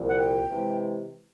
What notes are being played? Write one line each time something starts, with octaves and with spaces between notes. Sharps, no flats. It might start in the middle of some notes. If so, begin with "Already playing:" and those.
Already playing: C2 A#2 F3
F#5
G5
C3 E3 G#3